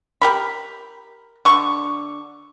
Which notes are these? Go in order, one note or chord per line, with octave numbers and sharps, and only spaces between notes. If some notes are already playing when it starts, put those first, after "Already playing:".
G4 A#4 B5
D3 C#6